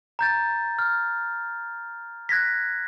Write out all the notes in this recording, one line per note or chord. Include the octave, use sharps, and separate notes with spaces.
A#5 G6 A6
F6
F#6 G#6 A#6 B6